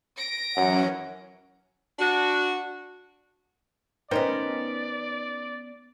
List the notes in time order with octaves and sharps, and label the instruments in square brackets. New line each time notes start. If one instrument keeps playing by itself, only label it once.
[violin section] A#6 D7
[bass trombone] F#2 [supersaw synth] E3 F#3 C#4 [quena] F#5
[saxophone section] D4 F#4
[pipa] D#3 C5 [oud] B3 C#4 D#4 [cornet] D5